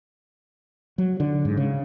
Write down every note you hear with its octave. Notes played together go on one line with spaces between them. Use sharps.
F#3
D3
G#2
C#3